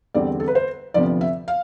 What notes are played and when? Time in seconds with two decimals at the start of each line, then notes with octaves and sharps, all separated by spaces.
0.14 E2 D3 G3 C4 D5
0.40 A4
0.48 B4
0.55 C5
0.94 D2 C3 F3 B3 D5
1.21 E5
1.48 F5